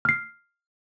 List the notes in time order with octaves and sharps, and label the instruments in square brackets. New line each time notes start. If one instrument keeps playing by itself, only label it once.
[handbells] F6 C7